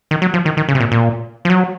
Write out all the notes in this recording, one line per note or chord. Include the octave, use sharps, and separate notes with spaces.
D#3
F#3
F3
D#3
D#3
C#3
C3
A#2
A#2
F3
F#3